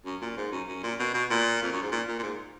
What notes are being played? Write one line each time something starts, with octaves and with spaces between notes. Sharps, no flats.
F#2
A#2
G#2
F#2
F#2
A#2
B2
B2
A#2
F2
F#2
G#2
A#2
A#2
A#2
G#2